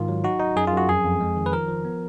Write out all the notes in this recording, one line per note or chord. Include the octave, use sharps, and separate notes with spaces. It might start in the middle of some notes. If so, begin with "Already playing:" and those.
Already playing: G#2 D#3 F4
F#3
D#4 F#4
D#4
F#2 G#4
F4
F#2 F#4
F2 G#4
F2
G#3
D#3
B4
F3 A#4
F3
B3